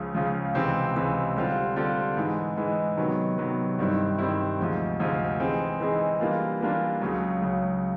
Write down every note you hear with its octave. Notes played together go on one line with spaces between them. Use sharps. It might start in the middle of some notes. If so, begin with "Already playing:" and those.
Already playing: C#2 C#3 F3
C#2 C#3 F3
C#2 C3 E3 G#3 C4
C#2 C3 E3 G#3 C4
D3 G3 C4 F4
D3 G3 C4 F4
G#2 E3 G#3
G#2 E3 G#3
C3 D#3 F#3 B3
C3 D#3 F#3 B3
G2 D#3 G3 C4 E4
G2 D#3 G3 C4 E4
D2 C3 F3 G#3
D2 C3 F3 G#3
E3 G#3 C4 D#4 G#4
E3 G#3 C4 D#4 G#4
E3 G3 A#3 D4 F4
E3 G3 A#3 D4 F4
C#2 C#3 F#3
C#2 C#3 F#3